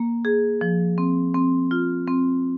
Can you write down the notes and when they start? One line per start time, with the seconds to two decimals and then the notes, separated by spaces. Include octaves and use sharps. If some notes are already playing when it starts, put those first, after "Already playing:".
Already playing: A#3
0.25 G#4
0.61 F3
0.98 C4
1.34 C4
1.71 F4
2.07 C4